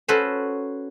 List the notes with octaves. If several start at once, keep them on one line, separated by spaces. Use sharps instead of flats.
C#4 F#4 A4 B4 C5